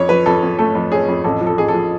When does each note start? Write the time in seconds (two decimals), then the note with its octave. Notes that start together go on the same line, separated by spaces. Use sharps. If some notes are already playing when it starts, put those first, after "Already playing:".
Already playing: F2 C#5
0.09 F3 B4
0.26 F2 A4
0.43 F2
0.59 A3 A4
0.75 F2
0.91 C#4 G#4
1.08 F2
1.24 A1 A4
1.41 F3
1.47 A4
1.57 A1 G#4
1.68 A4
1.74 F3